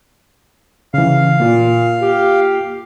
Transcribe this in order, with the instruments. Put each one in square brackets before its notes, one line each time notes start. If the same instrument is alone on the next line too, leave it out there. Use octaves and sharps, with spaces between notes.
[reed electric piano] C#3 E3 [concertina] F5
[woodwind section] A#2 [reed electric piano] A#3 F4
[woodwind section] G4